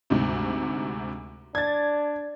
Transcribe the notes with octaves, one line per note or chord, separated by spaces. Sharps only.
D2 G#2 C3
D4 G#6 A6